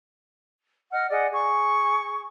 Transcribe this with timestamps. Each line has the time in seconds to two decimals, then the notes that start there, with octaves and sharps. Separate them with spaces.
0.92 D#5 F#5 F6
1.10 G#4 D5 D#5 F#5
1.31 G#4 C#6